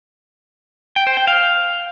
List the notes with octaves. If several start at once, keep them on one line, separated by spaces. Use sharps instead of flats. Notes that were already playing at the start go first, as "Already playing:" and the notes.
G5
C5
G5
F5